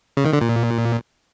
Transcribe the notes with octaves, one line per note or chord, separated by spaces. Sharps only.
C#3
D#3
D3
A#2